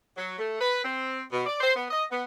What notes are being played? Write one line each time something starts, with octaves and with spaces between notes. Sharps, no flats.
F#3
A3
B4
C4
B2
D5
C5
B3
D#5
B3